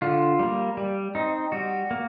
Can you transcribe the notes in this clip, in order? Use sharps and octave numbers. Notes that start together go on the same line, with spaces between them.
D3 F4
G3 A#3
G3
C4 D#4
G3 F#4
A#3